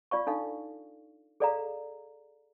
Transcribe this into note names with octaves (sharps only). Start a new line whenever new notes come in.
F4 D5 F5 C#6
D4 D#4 A4 F5
G#4 A4 D5 D#5 F5 A#5